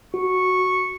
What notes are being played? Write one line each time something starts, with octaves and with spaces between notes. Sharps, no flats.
F#4 C#6